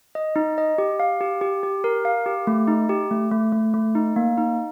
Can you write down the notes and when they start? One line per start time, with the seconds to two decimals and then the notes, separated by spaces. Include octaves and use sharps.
0.15 D#5
0.36 D#4
0.58 D#5
0.78 G4
1.00 F5
1.21 G4
1.41 G4
1.63 G4
1.84 A#4
2.05 F5
2.26 G4
2.47 A3
2.68 D#4
2.89 G4
3.11 A3
3.31 A3
3.52 A3
3.74 A3
3.95 D#4
4.16 A#3
4.38 D#4